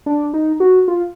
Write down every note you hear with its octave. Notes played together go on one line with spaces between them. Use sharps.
D4
D#4
F#4
F4